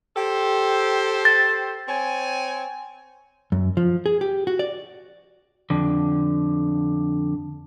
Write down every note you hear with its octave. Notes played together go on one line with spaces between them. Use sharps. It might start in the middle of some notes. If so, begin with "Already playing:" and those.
G4 A4 C5
A6
C4 C#5 G#5
F#2
F3
G#4
G4
F#4
D5
F2 D3